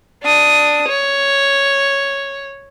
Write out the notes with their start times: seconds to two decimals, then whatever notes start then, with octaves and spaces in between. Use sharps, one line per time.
0.23 D4 D#6
0.88 C#5